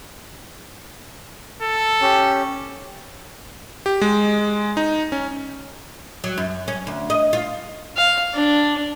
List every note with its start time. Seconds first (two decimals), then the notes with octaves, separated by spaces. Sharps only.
1.62 A4
2.01 C#4 G4
3.86 G4
4.01 G#3
4.77 D#4
5.12 C#4
6.24 F#3
6.38 F#2
6.68 C#4
6.87 D2
7.10 D#5
7.33 F4
7.97 F5
8.34 D4